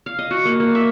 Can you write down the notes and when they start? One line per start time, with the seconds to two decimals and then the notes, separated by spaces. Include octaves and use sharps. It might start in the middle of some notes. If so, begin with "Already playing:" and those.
0.06 F5
0.19 D#5
0.31 F#4
0.45 A#3
0.60 A#3
0.75 E5